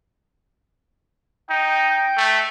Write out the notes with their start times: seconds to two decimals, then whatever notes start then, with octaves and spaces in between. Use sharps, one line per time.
1.50 D#4 G5
2.17 A3